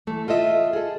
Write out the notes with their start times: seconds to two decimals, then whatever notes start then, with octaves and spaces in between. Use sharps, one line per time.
0.07 E3 A3
0.28 F4 A4 D#5 E5
0.73 G#4 A4